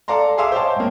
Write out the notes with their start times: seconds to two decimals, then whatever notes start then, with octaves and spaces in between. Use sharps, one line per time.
0.08 A4 D5 F5 A#5 C6
0.38 G#4 E5 F5 C6 D6 E6
0.52 C5 C#5 D#5 F5 G5 A5
0.76 G#2 A#3